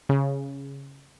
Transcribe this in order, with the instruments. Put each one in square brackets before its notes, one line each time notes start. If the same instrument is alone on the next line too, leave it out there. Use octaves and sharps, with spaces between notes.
[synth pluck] C#3